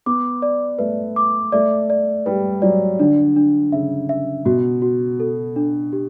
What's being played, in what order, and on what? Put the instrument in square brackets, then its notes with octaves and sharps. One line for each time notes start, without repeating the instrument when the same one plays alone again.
[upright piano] B3 [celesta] D6
[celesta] D5
[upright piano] A3 [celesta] B4
[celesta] D6
[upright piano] A3 [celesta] D5
[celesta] D5
[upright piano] G3 [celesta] B4
[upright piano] F#3 [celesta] D5
[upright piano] D3 [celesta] D4
[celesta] D4
[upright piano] C#3 [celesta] E5
[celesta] E5
[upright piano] B2 [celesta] F#4
[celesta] F#4
A4
D4
G4